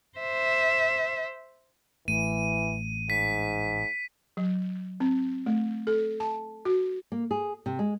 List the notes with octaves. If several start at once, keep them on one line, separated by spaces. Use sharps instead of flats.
C5 E5
A1 E3 A3 D#7
G#2 B6
F#3
C4
A3
A4
A5
F#4
A#3
G#4
C3
G#3